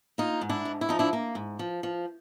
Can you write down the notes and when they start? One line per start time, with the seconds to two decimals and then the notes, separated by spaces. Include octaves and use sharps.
0.18 A#3 D#4 F4
0.41 G#2
0.49 D4 E4
0.65 G#2
0.81 E4
0.89 F3 D#4
0.99 D4 E4
1.13 A#3
1.35 G#2
1.59 F3
1.83 F3